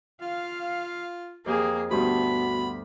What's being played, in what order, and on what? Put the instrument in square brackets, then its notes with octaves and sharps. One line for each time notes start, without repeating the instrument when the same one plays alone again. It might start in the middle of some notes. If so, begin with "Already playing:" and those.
[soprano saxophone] F4 [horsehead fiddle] F5
[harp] F2 G4 D#6 [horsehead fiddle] A#3 G#4
[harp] D2 G2 G4 [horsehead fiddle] B3 [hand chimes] F#4 C6 [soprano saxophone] B5